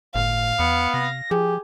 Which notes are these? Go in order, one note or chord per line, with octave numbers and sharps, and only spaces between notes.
G1 A2 F5
E2 B3 C#7
C3 A#6
F3 G4 G#4